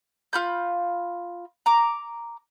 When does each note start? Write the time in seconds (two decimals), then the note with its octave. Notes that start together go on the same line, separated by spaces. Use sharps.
0.33 F4 B5 G6
1.66 A#5 D6